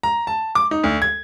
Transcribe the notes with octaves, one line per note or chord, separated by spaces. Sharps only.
A#5
A5
D6
D#4
D2
G#6